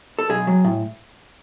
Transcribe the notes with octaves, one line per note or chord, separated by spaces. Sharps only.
A4
B1 G#4
F#3
A2